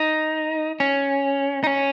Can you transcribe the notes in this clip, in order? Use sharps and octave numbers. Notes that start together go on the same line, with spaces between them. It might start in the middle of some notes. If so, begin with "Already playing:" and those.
Already playing: D#4
C#4
D#4
C#4